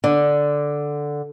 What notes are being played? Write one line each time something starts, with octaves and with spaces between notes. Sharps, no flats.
D3